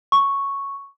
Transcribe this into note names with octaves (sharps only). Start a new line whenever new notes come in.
C#6